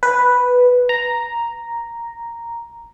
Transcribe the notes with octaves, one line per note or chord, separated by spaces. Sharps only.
B4
A#5